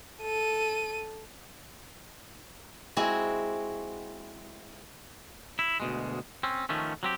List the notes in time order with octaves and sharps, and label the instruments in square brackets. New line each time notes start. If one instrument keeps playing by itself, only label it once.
[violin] A4 D#7
[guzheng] G#3 C4 E4 F#4 G#4
[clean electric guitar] E4
D2 B2 G#3
C4 C#4
D#3 F3 A3 C#4
F#3 C4 G4